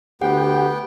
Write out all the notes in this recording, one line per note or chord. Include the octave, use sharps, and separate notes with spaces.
D2 B3 G4 F#5 G5